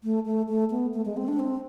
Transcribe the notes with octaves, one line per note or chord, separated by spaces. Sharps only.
A3
A3
A3
B3
A3
G#3
C4
D4
C4